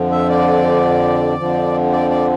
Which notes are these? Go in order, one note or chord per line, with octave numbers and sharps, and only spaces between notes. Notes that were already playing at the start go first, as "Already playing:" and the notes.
Already playing: F2 D3 F3
E5
D5
F2 D3 F3
D5
D5